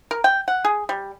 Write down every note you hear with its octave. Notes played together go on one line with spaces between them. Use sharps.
A#4
G5
F#5
G#4
G3